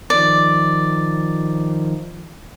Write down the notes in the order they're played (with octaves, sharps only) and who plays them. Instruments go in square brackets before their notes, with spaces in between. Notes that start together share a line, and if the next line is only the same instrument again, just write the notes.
[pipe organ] D#3 F3 [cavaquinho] D5